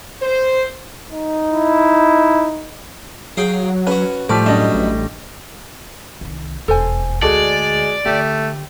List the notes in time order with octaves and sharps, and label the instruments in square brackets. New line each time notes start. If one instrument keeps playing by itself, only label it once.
[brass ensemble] C5
[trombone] D#4
[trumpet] E4
[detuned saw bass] F#3 [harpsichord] G#4 F5 G5
[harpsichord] C#4 F#4 [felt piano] B4
[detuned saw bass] A2 [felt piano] F3 [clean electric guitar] G3 A3 [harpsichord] D5
[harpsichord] F#2 B2 [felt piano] D4 D#5
[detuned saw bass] A1
[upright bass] C2 D#3
[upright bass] E1 F2 [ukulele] A4 C5 G#5
[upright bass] D2 [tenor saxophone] G#3 [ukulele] F#4 G#4 A4 [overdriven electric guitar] D5
[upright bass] D3 [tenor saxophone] A3 [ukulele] G4